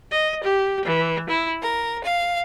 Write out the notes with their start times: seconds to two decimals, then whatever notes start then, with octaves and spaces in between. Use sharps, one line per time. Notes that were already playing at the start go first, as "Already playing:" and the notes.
0.11 D#5
0.41 G4
0.84 E3
1.28 E4
1.61 A#4
2.03 F5